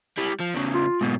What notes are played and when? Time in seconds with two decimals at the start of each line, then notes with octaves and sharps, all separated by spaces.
0.18 G3 E4
0.40 F3
0.54 E2 C#3
0.74 F4
1.01 G#2 B2